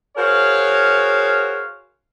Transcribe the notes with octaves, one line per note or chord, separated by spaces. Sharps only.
F#4 G#4 A#4 C5 C#5 F5